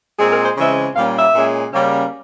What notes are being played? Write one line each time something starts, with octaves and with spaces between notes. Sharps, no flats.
A#2 G#3 C4 G#4
A#4
C5
C#3 E3 G#3 C4 E5
A#2 G3 A#3 C#4 F5
E5
A#2 G#3 C#4
C#3 G3 A#3 C#4